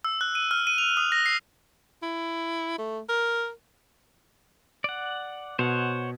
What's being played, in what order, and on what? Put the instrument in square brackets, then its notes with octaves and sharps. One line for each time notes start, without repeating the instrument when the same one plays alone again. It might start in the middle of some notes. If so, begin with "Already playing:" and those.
[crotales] E6
F#6
D#7
F6
D#7
F7
D#6
A#6
C7
[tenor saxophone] E4
A3
A#4
[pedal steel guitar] D5 F#5
[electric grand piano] B2 [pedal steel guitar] C5 C#5 F#5